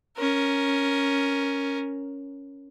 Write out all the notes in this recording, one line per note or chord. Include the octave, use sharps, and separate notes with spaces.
C#4 A#4